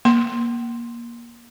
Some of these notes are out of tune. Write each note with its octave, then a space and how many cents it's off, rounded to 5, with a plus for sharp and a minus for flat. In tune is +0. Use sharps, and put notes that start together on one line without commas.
A#3 +20 C6 +0